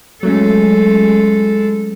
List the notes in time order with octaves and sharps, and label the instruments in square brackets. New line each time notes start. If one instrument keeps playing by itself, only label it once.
[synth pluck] F#3 A3 C#4 [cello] G#3 A4